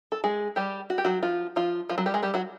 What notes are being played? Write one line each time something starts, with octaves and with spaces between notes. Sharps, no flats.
A4
G#3 G#4
G3 G4
F#4
G4
F#3 F#4
F3 F4
F3 F4
F3 F4
F#3 F#4
G3 G4
G#3 G#4
G3 G4
F#3 F#4